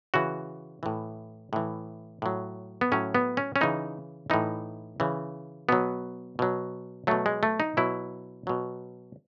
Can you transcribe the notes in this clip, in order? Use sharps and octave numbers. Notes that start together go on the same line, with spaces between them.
C#3 E3 F#4
A2 E3
A2 E3
A2 F#3
B3
A2 F#3 C#4
B3
C#4
C#4
C#3 E3 D#4
A2 E3 D#4
C#3 E3
B2 F#3 B3
B2 F#3
B2 F#3 A3
G#3
A3
D#4
B2 F#3 E4
B2 F#3